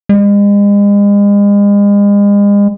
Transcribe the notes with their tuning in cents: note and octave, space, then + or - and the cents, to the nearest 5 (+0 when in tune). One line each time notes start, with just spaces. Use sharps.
G#3 -40